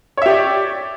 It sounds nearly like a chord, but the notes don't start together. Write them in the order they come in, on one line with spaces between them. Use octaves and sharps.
C#5 E5 G4 D5